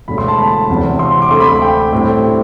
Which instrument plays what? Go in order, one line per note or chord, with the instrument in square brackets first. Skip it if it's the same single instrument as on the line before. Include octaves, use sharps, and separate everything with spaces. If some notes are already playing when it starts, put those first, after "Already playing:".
[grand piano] E1 E2 D3 A3 B5
C6
A5
B5
E2 C3 F#3 C4
C6
D6
D2 D3 A3 C4 C6
B5
G5
A2 G3 C4 E4